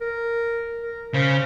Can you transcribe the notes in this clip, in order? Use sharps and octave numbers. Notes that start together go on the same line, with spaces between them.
A#4
A#4
C#3 C5